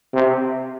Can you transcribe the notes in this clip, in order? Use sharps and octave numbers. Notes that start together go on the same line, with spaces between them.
C3